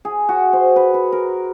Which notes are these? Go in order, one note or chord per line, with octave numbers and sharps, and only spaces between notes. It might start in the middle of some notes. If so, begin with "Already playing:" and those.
G#4
F#4
C5
B4
B4
A#4